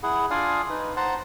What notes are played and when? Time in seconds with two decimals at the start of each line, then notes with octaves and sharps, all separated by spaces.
0.03 E4 G#4 F#5
0.31 D4 F4 D5 F5 G#5 D#6
0.70 D#4 B4
0.97 C5 F#5 A5 A#5 C6